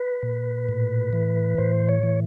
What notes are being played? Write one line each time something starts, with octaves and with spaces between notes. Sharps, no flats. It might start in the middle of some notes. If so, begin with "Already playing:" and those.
Already playing: B4
A#2
A2
E3
A2 C5
C#5
E3